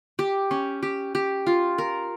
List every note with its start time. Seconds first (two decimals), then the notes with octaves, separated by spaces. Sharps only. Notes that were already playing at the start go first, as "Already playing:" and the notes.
0.19 G4
0.51 C#4
0.83 G4
1.15 G4
1.46 F4
1.78 A#4